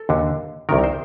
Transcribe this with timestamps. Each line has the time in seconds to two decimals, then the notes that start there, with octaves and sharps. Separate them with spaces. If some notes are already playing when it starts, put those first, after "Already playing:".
Already playing: A4
0.09 D#2 D3
0.69 C2 C3 D#3 A#4
0.84 C5